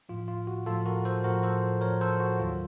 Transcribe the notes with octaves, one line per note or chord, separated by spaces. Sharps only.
A2 F3 F4
F4
F#4
A2 F3 F4 A4
F#4 A#4
A4 C5
A2 F3 F#4 A#4
A4 C5
A2 F3 A#4 C#5
A4 C5
F#4
D#2 D#3 F#3 F4